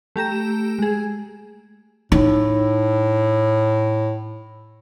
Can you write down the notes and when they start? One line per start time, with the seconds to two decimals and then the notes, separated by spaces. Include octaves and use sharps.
0.16 A3 G4 A#5 E7
0.79 G#3 G#4
2.12 A2 D#4